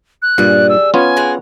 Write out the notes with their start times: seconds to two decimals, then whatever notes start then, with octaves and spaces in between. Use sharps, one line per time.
0.22 F#6
0.38 G2 A#2 G3 G#4
0.69 E6
0.94 B3 C#4 F4 G#5
1.17 G#3 F#5 A#5